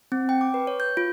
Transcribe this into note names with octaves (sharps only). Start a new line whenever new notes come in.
C4
G5
D6
B4
C#5
G6
F4